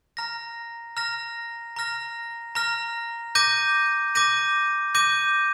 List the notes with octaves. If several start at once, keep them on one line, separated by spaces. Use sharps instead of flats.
A#5 F6 A#6
A#5 F6 A#6
A#5 F6 A#6
A#5 F6 A#6
D6 G6 A#6 D#7
D6 G6 A#6 D#7
D6 G6 A#6 D#7